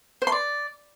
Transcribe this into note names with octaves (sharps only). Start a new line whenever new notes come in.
C5
C6
D5